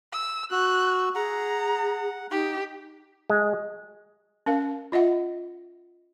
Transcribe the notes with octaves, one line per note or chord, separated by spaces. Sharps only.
E6
F#4 E6 F#6
G#4 F#5 A#5
D#4 G4
G#3
C#4 A#4 F5
F4 D#5 E5 F#5